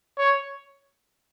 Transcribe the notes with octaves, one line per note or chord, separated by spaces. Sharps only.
C#5